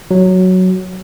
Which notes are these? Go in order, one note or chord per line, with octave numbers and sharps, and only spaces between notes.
F#3